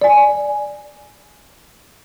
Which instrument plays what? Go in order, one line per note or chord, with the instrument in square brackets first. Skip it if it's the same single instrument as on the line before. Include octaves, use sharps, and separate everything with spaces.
[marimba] D5 G#5